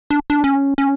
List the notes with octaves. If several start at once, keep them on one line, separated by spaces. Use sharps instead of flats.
D4
D4
C#4
C#4